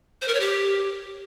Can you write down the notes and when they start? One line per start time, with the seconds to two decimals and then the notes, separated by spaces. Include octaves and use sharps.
0.22 C5
0.28 A#4
0.34 C#5
0.40 G4